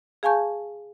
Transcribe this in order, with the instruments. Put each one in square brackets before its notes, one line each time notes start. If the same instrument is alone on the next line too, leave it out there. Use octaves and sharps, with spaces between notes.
[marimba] G#4 F5 G#5 A5 C#6 G6